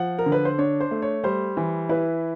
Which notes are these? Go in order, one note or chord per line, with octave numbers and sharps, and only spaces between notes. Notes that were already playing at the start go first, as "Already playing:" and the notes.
Already playing: F3 F#5
A#4
D3
B4
C5
D4 C#5
C5
A3
C#5
G3 C5
E3
E4 B4